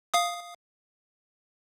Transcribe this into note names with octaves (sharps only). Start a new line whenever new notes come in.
F5 D#6